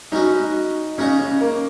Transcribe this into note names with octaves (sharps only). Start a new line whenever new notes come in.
G#3 C#4 D#4 F#4 B4 D#5
C#3 G#3 C#4 D#4 G#4 D#5
C#4
A#3